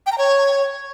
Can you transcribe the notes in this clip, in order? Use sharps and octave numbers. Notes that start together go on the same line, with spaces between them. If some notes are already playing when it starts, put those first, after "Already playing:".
G5
A#5
C#5